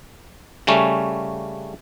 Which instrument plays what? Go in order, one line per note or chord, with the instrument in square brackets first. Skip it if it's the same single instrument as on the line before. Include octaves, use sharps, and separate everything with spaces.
[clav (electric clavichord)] C#3 G3 A3 C#4